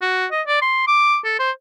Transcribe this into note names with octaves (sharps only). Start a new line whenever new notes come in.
F#4
D#5
D5
C6
D6
A4
C5